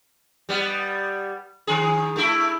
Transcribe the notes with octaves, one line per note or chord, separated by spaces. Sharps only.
G3 B3
D#3 G#4
A3 E4